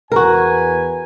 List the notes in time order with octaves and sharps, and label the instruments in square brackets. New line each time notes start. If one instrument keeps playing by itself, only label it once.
[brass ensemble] E2 B4 G#5 [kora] F#4 A#4